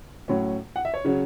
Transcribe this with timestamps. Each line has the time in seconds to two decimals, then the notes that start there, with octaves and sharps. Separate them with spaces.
0.28 A2 F#3 C#4
0.76 F#5
0.85 E5
0.94 C#5
1.05 C#3 F#3 C#4